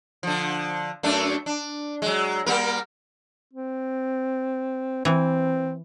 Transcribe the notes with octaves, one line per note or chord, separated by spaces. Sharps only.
D3 F3
F#2 A3 D4
D4
F#3 G#3
G3 A#3 A#4
C4
E3 C4